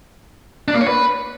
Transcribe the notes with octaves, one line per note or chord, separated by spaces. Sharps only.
D4
A#3
C#5
B4